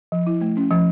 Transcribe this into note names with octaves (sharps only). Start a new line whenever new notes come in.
F3
E4
A3
C#4
F3